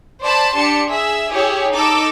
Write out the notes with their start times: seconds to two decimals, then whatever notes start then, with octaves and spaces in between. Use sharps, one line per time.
0.22 C5 D5 A5 B5
0.54 D4 G4 A5 C6 C#7
0.89 G#4 E5
1.31 E4 G4 G#4 C#5
1.71 D#4 A4 D6 E6